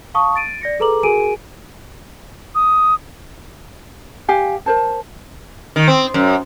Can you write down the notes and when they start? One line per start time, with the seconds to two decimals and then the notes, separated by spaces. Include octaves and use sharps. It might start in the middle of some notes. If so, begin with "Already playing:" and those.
0.14 F5 A5 C#6 D#6
0.36 A6 D7 D#7
0.61 D5 A#6 C#7
0.80 G#4 A4 B4 A#5 D6 F#7
1.03 F#4 G#4 A#4 G#5 D7 D#7
2.55 D#6
4.28 G4 F5 G#5
4.66 A#4 C5 A5
5.76 D#3
5.88 C4
6.14 F#2